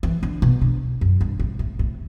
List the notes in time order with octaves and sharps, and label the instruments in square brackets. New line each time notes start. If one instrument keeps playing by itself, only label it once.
[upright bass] E3
D3
B2
D3
F#2
G2
A2
A2
A2